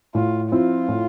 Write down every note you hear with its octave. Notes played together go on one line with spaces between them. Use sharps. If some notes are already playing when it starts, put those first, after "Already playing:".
A2 F4
F3 C4 E4 F4
A2